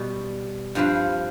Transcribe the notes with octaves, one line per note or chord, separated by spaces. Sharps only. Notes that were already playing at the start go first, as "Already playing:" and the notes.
Already playing: B2 G3 B3
G2 F3 C4 F4 B4